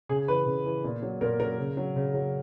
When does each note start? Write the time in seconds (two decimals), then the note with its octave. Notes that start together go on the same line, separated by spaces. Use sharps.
0.09 C#3 G#4
0.28 E3 B4
0.46 C#3
0.65 E3
0.84 A#2
1.02 F#3
1.21 A#2 A#4
1.40 F#3 A#4
1.59 C#3
1.77 F#3
1.96 C#3
2.14 F#3